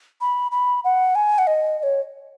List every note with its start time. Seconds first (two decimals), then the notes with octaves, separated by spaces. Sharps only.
0.21 B5
0.51 B5
0.84 F#5
1.15 G#5
1.38 F#5
1.47 D#5
1.79 D#5
1.83 C#5